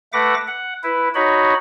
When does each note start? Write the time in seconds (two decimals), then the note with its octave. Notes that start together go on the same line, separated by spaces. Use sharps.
0.13 A3 B4 E5 F#5 D6 A#6
0.47 F#5
0.83 E4 B4
1.15 D#4 F#4 C#5 B5